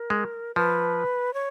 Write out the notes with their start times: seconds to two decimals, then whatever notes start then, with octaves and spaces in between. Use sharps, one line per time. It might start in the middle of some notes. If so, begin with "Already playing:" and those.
Already playing: A#4
0.10 G#3
0.55 F3 B4
1.34 C#5